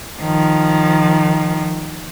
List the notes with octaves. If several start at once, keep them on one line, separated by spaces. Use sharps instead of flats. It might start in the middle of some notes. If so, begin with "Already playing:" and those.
D#3 F3